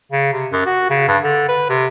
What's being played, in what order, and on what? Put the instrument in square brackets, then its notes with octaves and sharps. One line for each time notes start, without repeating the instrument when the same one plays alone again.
[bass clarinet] C#3
C3
F#2
F#4
C#3
G2
D3
B4
C3